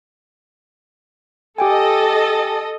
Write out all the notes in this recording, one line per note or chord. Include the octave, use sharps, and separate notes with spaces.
G4 A4 D#5 G5 G#5